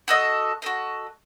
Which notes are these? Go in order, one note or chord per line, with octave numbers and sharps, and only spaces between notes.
F#4 A4 D#5
F#4 A4 D#5